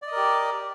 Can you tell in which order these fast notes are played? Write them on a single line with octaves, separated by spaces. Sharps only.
D5 D#5 A#4 G4